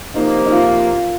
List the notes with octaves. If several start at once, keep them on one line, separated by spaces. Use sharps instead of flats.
C3 F3 A#3 D#4
D#4
F4